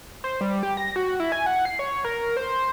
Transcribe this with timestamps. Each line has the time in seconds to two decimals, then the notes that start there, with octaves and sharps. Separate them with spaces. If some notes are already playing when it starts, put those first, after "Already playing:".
0.24 C5
0.41 G3
0.63 G4
0.77 A#6
0.96 F#4
1.20 E4
1.32 G#5
1.46 F#5
1.65 C7
1.79 C#5
2.04 A#4
2.37 C5